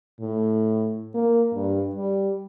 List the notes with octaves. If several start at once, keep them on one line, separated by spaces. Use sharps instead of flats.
A2
A#3
G2
G3